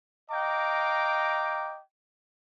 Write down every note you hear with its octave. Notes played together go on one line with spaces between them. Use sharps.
D#5 F5 G5 A#5 D6